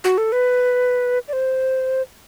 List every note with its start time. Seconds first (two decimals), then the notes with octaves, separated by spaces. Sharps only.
0.04 F#4
0.18 A4
0.32 B4
1.28 D5
1.33 C5